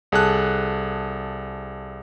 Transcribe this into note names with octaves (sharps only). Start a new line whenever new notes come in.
C2 G#4 A4 A5 F#6